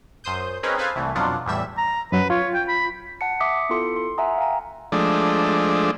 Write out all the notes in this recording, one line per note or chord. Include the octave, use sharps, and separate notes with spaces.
F#2 C5 C6 D#6 G6
C4 C#4 D#4 G#4 A#4 B4
G#4 A4 B4 C5 F5 G#5
C2 E3 A3
F2 B2 F#3 D4 F4 F#5
E2 A2 E3 G3 E5 E7
A#5
F#2 F#3 B4
F4 C#5
G5
B5
F#5 A5 C#7
E5 D6 D#6 B6 C#7
B3 E4 F4 A4 C6 C#7
C6
E5 F#5 G#5 A#5 D#6
F5 G5 G#5 A#5
F3 G#3 A3 D4